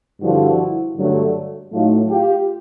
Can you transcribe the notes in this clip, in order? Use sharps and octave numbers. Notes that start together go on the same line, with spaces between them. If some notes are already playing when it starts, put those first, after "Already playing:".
G2 D3 F3 E4 F#4
G2 D3 F#3 A3
A2 F#3 A3 D#4 F4
F4 G4